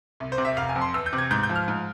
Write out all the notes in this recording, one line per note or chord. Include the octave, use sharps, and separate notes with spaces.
C2
C5
C3
E5
F1 F5
G#5
F2
C6
E2 E6
G6
C3
G#6
G#2 G6
G6
F3
F6
G#2